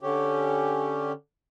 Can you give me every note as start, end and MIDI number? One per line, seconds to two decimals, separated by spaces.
0.01 1.12 50
0.01 1.12 61
0.01 1.12 67